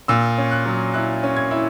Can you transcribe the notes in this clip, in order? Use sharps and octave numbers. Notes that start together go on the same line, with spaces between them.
A#2 E6
C#4
F#6
F#3
E4 F#6
C#4
G#6
E4